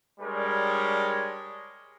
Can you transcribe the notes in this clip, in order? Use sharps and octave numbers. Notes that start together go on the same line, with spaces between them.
G3 G#3 D4 A#4 C#5